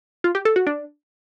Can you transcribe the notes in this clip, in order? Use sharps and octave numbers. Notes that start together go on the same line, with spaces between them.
F4
G4
A4
F#4
D4